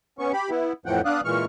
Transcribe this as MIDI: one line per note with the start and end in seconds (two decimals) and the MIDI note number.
0.19 0.32 59
0.19 0.32 61
0.19 0.32 85
0.33 0.50 67
0.33 0.50 83
0.50 0.73 59
0.50 0.73 64
0.86 1.01 41
0.86 1.01 45
0.86 1.01 52
0.86 1.01 53
0.86 1.01 78
0.86 1.01 79
1.05 1.21 59
1.05 1.21 62
1.05 1.21 74
1.05 1.21 77
1.05 1.21 87
1.05 1.21 90
1.24 1.45 46
1.24 1.45 52
1.24 1.45 56
1.24 1.45 85
1.24 1.45 89